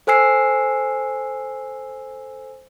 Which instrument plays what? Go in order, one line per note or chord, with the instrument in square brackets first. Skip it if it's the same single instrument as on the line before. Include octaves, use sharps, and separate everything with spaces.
[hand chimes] A4 C5 G#5 E6 C7